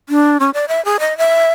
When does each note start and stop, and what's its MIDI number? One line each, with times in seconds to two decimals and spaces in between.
0.09 0.37 62
0.40 0.50 61
0.54 0.65 74
0.68 0.84 76
0.85 0.97 68
1.00 1.16 75
1.18 1.52 76